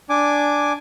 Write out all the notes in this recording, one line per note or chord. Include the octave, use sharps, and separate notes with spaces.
D4 G#5 D6